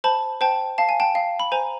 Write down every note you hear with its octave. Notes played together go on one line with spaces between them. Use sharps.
C5 A5 B5
C5 G5 A5
F5 A5
G#5
G5 A5
F5
B5
C5 G#5 A#5